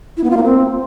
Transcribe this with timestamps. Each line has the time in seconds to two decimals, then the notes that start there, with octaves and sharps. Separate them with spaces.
0.17 E4
0.24 B3
0.30 F4
0.37 A#3
0.44 C4